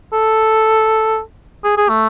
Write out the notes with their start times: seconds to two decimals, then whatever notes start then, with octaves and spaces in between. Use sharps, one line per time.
0.13 A4
1.64 G#4
1.77 G#4
1.89 A3